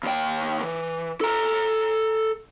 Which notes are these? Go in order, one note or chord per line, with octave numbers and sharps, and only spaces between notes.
D#2 G5
E3
A4 A#5